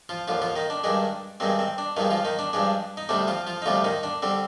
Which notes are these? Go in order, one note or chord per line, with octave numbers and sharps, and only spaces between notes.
F3 F4
D#2 D3 F3 F4
F3 F4
D#3 D#4
D4
G2 D#3 G#3 D4
G2 D#3 G#3 C4
C4
D4
G2 D#3 F3 G#3 D#4
F3 F4
D#3 D#4
D4
G2 F3 G#3 D4
D#4
D2 C3 G3 D4
F3 F4
F3 F4
D#4
D2 C3 F3 G3 F4
D#3 D#4
D4
D3 G3 C4